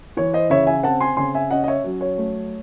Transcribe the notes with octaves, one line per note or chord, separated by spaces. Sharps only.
E3 C#5
C5 D#5
C#3 C#5 E5
E5 G#5
C4 F#5 A5
G#5 C6
C#3 G#5 C6
E5 G#5
C#4 D#5 F#5
D#5
C#5 E5
F#3
C#5
A3